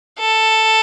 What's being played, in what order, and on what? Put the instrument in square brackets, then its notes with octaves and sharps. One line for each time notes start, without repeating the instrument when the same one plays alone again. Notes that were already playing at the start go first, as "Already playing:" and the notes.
[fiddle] A4